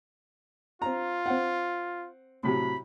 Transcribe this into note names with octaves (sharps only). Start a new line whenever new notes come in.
C4 F4 A#5
C4 F#5
A2 C3 F#3 B5